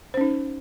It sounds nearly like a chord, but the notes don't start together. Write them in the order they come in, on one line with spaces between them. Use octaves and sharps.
C5 C#4 D#4